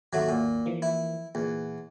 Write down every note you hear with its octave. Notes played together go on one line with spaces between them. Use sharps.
G#1 D#2 F#3 A3 F#4
A#2
E3 F3 A#3
E4
E2 A#2